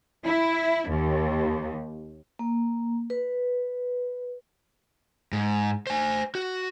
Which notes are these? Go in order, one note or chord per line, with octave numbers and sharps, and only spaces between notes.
E4
D#2
A#3
B4
G#2
C5 G#5
F#4